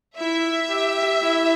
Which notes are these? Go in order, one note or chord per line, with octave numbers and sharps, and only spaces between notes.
E4 E5
G4
E4